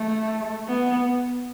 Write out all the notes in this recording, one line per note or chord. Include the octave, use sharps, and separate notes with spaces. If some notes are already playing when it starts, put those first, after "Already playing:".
Already playing: A3
B3